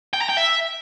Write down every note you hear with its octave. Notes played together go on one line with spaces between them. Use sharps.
G5
A#5
G5
E5